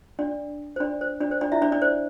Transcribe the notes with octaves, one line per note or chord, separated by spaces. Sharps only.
D4 D5
C5
D4 D5
C5
D4 D5
C5
D4 D5
E4 E5
D4 D5
D4 D5
C5